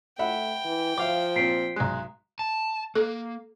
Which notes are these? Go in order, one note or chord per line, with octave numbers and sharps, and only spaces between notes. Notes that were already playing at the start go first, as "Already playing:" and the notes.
A3 E5 F#5 G5 B5
E3
F3 E5 F5 D6
A#2 C4 B6 C7 D7
B1 G#3 A#5 F#6
A5
A#3 A4